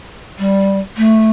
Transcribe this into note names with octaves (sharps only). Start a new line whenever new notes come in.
G3
A3